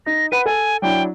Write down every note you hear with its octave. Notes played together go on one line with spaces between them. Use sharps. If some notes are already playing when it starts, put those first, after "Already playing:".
D#4 A#6
B4 F#5 B5 D#7
A4 G#5
F#3 D4 E4 G5